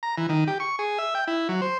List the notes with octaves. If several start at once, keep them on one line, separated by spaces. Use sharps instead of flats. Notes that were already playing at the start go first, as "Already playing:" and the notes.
A#5
E3
D#3
G4
C#6
G#4
E5
G5
E4
F#3
C5